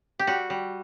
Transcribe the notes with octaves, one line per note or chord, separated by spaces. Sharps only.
G4
G3 F#4
G3